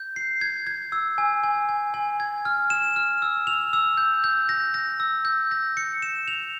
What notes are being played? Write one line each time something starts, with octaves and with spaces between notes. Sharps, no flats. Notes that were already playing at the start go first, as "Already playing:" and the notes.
Already playing: G6
C7
G#6
G#6
E6
G#5
G#5
G#5
G#5
G#6
F6
E7
F6
E6
F7
E6
G6
G6
A#6
A#6
E6
G6
A#6
C#7
E7
F7